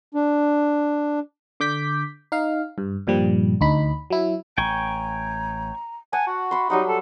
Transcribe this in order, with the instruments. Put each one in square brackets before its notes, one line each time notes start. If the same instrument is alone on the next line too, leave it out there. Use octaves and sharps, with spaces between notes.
[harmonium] D4
[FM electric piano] D3 D6 G6 B6
D#4 F5
G2
G2 A#2 F3 G3
D2 D#4 B5
F#3 E4
[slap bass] A1 [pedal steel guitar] G5 G#5 C#6 [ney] A#5
[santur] F#5 A5 [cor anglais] G#5
[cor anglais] F#4
[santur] E5 B5 C6
[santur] F#3 G3 F#5 [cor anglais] D#4
[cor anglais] A4